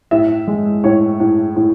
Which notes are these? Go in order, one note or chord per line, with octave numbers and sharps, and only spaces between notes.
A2 E5
G#3
A2 C#5
A2
A2